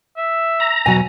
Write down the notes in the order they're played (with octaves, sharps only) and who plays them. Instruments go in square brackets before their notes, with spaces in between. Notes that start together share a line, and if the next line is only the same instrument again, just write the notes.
[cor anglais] E5
[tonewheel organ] A#5
[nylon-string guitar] E2 B2 F#3 [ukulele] G#5